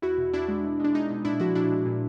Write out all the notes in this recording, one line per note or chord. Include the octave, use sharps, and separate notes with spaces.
E2 E4 F#4
B2
E2 D4 E4
G#3
B2
G#3 D4
G#3 D#4
B2
A#2 D4 E4
F3 E4 F#4
A#2 D4 E4
G#3
A#2